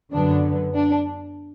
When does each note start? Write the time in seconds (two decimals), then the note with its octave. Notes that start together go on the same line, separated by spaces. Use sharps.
0.12 F#2 D3 F#3 B3 D4
0.74 D4